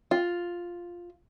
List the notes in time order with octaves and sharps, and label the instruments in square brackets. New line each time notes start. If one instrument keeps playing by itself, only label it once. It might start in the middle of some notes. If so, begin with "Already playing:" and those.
[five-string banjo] F4